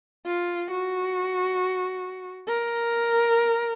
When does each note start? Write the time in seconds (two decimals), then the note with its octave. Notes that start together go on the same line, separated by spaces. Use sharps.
0.26 F4
0.71 F#4
2.48 A#4